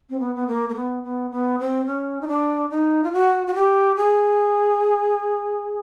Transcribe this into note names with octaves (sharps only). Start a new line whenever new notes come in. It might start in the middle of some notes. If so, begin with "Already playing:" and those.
C4
B3
B3
A#3
A#3
B3
B3
B3
C4
C#4
D#4
D4
D#4
F4
F#4
F#4
G4
G#4